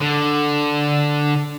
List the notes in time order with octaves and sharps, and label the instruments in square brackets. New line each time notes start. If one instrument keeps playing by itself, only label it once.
[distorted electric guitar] D3